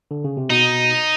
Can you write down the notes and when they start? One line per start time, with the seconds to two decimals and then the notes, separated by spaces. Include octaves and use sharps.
0.11 D3
0.24 C#3
0.37 C3
0.50 B2 D#4